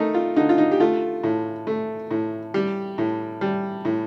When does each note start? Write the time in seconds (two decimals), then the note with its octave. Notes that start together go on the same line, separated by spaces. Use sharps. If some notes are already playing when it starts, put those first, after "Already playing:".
Already playing: A3 D#4 A#4
0.14 F4
0.36 D3 D#4
0.49 F4
0.58 D#4
0.72 G4
0.80 A3 F4
1.23 A2
1.67 A3
2.11 A2
2.54 G3 G4
2.98 A2
3.41 G3
3.85 A2